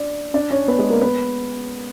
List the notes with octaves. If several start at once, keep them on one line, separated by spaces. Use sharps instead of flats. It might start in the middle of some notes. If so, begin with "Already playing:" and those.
Already playing: D4 D5
D4 D5
C#4 C#5
B3 B4
G#3 G#4
A#3 A#4
B3 B4